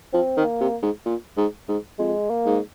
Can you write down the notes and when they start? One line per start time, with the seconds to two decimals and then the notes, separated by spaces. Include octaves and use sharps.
0.13 F3 C4
0.37 D#3
0.44 A#3
0.60 C3
0.83 G#2
1.05 A#2
1.37 G#2
1.68 G#2
1.99 F2 G#3
2.30 A#3
2.45 G#2